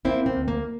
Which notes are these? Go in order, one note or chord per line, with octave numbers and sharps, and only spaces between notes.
A#3 C4 E4
C4
D2
A#3